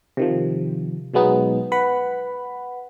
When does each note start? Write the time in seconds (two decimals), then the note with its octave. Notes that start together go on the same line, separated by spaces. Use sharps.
0.17 C3 D#3 F3
1.14 B2 F#3 G#3 B3 D#4
1.72 B4 F#5 B5